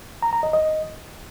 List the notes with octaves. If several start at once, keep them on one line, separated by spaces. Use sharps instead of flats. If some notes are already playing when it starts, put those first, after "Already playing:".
A#5
A#5
D#5
D#5